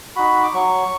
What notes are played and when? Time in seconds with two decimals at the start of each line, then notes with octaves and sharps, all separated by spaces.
0.16 D#4 F#4 B5
0.43 D6
0.53 F#3 C#6